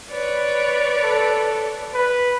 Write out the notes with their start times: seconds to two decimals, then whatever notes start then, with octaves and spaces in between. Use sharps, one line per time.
0.10 B4 C#5 D5
1.03 A4
1.94 B4